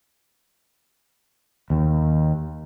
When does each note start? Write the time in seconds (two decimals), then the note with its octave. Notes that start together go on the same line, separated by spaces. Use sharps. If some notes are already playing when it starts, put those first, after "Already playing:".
1.70 D#2